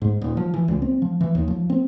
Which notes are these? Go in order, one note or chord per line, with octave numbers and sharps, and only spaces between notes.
G#2
D#1
F3
E3
C#2
C4
F3
E3
D#2
F3
C4